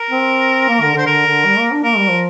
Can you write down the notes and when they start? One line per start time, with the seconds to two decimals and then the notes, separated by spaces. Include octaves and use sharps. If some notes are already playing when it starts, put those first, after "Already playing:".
Already playing: A#4
0.10 C4
0.69 A#3
0.81 D3
0.94 D3
0.98 C5
1.07 D3 A#4
1.27 D3
1.45 G3
1.59 A#3
1.71 D4
1.84 A#3 A#4
1.97 G3
2.10 F3